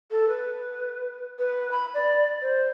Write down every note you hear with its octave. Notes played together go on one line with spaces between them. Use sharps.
A4
B4
B4
B5
D5
C5